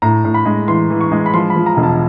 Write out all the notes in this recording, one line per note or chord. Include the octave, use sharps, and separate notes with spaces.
A2 A#5
A2
B5
G#3
E3 C6
E3
C#6
G#3
B5
F3 C6
B5
F3
A#5
E1
A5